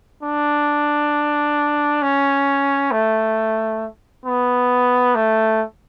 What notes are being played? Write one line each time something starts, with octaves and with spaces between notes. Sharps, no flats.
D4
C#4
A3
B3
A3